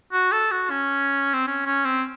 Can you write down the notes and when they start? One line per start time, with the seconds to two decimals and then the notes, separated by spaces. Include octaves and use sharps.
0.12 F#4
0.32 A4
0.51 F#4
0.70 C#4
1.34 C4
1.47 C#4
1.66 C#4
1.85 C4